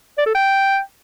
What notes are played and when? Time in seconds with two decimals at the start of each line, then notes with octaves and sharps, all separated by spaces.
0.18 D5
0.26 A4
0.35 G5